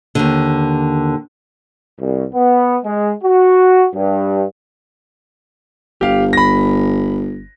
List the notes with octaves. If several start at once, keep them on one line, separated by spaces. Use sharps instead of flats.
D#2 D3
C2
B3
G#3
F#4
G2
G1 G4 F5
B5 A#6